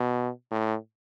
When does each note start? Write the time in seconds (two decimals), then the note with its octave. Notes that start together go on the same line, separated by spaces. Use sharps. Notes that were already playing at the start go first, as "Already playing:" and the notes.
Already playing: B2
0.51 A2